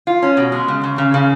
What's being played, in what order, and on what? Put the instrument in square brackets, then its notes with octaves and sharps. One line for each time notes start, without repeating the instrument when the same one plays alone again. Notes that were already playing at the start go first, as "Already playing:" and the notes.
[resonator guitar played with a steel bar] F4
C#4
B2
G#3
C#3
C#3
C#3
C#3